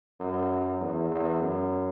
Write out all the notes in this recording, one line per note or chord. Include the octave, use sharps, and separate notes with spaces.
F#2
E2
E2
F#2